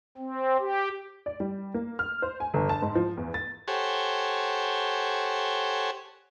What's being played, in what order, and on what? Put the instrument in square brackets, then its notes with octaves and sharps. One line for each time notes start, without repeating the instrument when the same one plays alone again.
[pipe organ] C4
G4
[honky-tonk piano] D5
G3
A#3
F6
C5
G#5
G1
A5
G#2
F3
E2
A6
[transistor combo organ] G4 A4 C5 C#5 F#5 G#5